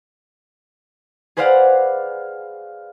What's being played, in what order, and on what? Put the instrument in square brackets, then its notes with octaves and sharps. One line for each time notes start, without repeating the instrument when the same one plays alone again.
[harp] G#4 B4 C5 D5 F5 F#5